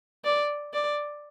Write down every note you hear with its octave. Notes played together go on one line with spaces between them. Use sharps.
D5
D5